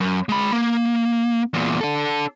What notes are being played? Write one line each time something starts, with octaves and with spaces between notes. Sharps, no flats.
F#2
G#3 B5
A#3
E2 A#2
D4 A4